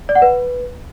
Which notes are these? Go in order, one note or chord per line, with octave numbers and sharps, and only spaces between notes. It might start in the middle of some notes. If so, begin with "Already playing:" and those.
D5
F#5
B4